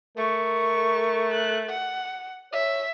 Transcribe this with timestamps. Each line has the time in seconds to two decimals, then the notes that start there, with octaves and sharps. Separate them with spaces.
0.17 A3 A#4 C#6
1.34 F#6
1.70 F#5
2.52 C#5 E5